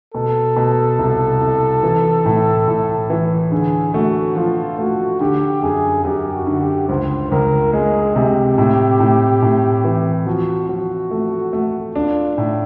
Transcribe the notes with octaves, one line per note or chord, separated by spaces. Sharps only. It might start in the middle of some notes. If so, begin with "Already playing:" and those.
B2 A4
B2
C2
C2
E3
A2
A2
E3
D3 G#4
A3 F#4
F3 F4
A3 F#4
D3 G4
F#2 G#4
F#2 G4
F#4
D3
G4
C#2 C5
C#2 A#4
G#3 G#4
C3 G4
A2
A2
A2
E3
F3 F#4
F3 F#4
A3
A3
D4 F4
A2